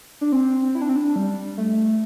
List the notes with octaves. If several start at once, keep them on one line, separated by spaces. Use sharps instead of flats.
D4
C4
E4
D4
C4
D4
G3
A3